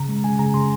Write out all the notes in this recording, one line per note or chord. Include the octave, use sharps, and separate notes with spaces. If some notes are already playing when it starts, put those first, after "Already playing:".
Already playing: C#3 A#5
G#3
C#3 G#5
C#3 A#5
C#3 C6